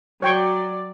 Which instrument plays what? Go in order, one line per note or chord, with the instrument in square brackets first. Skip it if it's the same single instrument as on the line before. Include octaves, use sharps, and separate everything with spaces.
[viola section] F#3 D5 [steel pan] C#5 G5 C#6